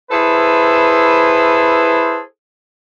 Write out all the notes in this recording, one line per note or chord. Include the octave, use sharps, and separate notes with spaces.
E4 G#4 A4 B4 C5